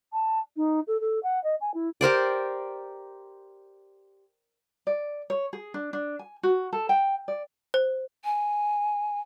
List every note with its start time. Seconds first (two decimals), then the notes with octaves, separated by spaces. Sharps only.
0.13 A5
0.56 D#4
0.87 A4
1.00 A4
1.23 F#5
1.44 D#5
1.61 G#5
1.74 E4
2.01 G4 A#4 C5 D5
4.87 D5
5.30 C#5
5.53 G#4
5.74 D4
5.93 D4
6.19 G#5
6.43 F#4
6.73 A4
6.89 G5
7.28 D5
7.74 C5
8.25 G#5